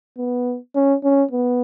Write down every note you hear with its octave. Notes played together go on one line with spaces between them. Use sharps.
B3
C#4
C#4
B3